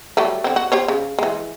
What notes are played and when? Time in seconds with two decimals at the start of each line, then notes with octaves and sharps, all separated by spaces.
0.17 F#3 G3 A3
0.44 D3 C4
0.56 F#4
0.72 G4 C5 C#5
0.88 C#3
1.19 E3 G#3